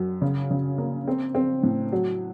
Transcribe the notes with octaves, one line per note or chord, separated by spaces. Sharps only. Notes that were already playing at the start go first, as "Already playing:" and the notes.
Already playing: F#2 F#3
C#3
C#3
A#3
C4
C4
A2
F#3